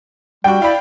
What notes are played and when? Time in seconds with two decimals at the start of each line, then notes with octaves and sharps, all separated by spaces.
0.44 G3 D4 F#4 G5
0.62 E4 D5 F5 B5